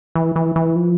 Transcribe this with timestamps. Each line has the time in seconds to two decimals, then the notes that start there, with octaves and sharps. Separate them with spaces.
0.15 E3
0.36 E3
0.56 E3
0.76 F3